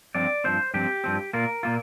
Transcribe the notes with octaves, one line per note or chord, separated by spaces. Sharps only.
G2 F3 C4 D5
G2 F3 C4 C5
G2 F3 C4 G4
G2 F3 C4
A#2 A#3 F4 A#4
A#2 A#3 F4